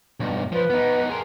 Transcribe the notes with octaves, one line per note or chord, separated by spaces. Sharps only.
B1 G2
F3 B4
B3 D#4
G#4 A#4 C6